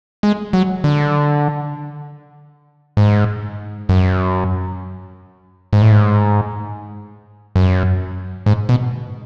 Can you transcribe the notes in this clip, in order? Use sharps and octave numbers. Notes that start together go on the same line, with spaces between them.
G#3
F#3
D3
G#2
F#2
G#2
A2
G#2
F#2
G#2
B2